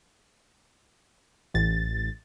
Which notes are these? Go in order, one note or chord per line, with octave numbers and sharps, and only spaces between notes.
A1 A6